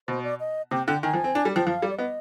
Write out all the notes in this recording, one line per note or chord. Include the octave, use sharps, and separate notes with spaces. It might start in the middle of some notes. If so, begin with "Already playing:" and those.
B2 C5
D5
D#5
C3 G5
D3 G5
D#3 G#5
F3
C4
D4
G3
F3 G5
F3 F5
G3
D5
B3 D#5